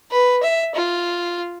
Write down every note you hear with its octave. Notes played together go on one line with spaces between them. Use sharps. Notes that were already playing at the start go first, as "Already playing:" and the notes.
B4
E5
F4